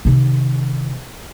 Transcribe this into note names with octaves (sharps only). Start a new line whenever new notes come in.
C3 D#3